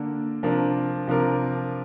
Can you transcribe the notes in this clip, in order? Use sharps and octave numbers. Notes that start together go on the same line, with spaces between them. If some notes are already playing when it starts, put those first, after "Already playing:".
Already playing: D3 A#3 D4 A#4
C3 F3 D4 A#4
C3 F3 D4 A#4